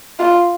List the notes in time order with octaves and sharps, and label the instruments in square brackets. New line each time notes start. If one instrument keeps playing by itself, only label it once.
[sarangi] F4